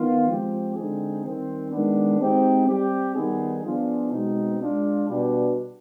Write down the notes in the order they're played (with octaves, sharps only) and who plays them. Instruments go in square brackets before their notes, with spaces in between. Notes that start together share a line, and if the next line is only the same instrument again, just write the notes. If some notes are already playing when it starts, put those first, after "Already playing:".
Already playing: [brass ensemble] D#3 B3 F4
F3 G#3 C4 G4
D3 G#3 C4 D#4 G#4
D#3 G3 C4
D#3 G#3 B3 D4
G#3 C4 D#4 G4
G3 C4 G4
D#3 G3 B3 D#4 G#4
F3 B3 D4 F4 G#4
B2 G#3 C4 D#4
G#3 D4 F4
B2 G3 D4